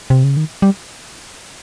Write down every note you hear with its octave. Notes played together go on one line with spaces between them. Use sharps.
C3
C#3
D#3
G3